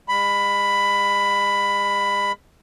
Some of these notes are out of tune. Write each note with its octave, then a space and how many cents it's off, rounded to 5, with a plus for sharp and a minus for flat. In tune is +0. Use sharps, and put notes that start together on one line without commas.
G#3 -45 B5 +10